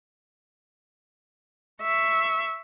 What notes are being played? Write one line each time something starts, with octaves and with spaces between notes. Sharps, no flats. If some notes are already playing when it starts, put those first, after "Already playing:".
E5 C#6